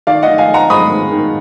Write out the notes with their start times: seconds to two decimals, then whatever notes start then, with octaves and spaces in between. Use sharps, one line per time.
0.07 D#3 D5 F5
0.23 D#5 F#5
0.28 D#3
0.38 F5 G#5
0.49 D#4
0.54 F#5 A#5
0.70 G#3 B5 D#6
0.91 D#3
1.12 D#3